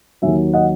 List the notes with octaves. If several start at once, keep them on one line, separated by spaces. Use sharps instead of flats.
D#2 D#3 F#3 E5 G#5
D#5 F#5